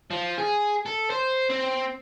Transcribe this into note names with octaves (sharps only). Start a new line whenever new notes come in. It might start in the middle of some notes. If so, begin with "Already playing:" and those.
F3
G#4
A4
C5
C4